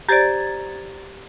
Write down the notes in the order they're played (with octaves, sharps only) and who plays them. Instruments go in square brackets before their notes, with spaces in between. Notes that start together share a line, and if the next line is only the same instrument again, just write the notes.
[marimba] G4 C5 D5 [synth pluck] A#5 G#6 A6